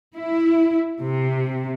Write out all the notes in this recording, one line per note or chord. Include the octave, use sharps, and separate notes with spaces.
E4
C3